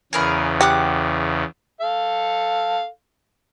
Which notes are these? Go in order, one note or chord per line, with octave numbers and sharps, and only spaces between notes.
E2 C#3 G#4 A#4 B4
G4 F#5 D6 F#6
A4 F5